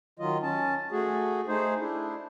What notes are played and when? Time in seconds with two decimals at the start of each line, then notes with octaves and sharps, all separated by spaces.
0.19 D#3 F#3 F4 D#5
0.43 C#4 A5
0.92 A3 F#4 G#4
1.48 A3 D#4 G#4 C5
1.80 D4 E4